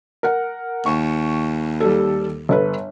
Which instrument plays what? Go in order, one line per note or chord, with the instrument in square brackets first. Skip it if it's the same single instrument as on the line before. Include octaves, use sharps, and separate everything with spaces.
[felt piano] A#4 F#5
[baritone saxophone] D#2 [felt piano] C#6
[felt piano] G3 A4
G1 A4 B4